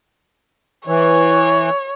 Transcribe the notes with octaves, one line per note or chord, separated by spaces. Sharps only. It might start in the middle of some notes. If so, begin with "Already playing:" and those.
E3 C#5